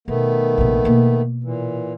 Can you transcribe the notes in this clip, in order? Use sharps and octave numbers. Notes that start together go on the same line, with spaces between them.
B2 D#3 A3 B3
A#1 C3
B2 A#3
A#2 E3